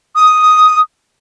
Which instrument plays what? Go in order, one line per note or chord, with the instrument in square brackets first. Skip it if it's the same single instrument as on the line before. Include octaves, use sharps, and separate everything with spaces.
[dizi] D#6